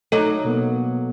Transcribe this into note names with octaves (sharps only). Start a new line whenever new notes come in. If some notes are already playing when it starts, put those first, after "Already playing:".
F#3 A3 D#4 A4
B2 A#3 B3